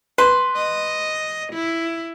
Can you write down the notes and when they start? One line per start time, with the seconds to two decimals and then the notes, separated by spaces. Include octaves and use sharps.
0.18 B4 C6
0.55 D#5
1.53 E4